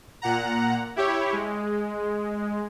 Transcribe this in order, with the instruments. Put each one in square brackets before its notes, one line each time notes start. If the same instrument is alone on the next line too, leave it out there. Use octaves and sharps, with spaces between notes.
[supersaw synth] A#2 F#5 A#5
E4 G4 C#5
G#3